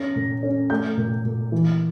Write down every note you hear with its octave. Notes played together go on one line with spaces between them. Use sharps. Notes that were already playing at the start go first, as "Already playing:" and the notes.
Already playing: C#4 A#6
A#2
C#4
A3 G6
A#2
A#2
E3